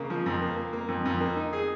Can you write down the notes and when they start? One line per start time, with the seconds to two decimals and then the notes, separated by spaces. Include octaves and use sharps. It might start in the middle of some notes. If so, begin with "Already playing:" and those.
Already playing: C#3 A#3
0.10 F3
0.26 F2
0.42 A#3
0.57 A#3
0.73 A#3
0.88 F2
1.05 F2
1.20 A#3
1.36 D#4
1.53 G#4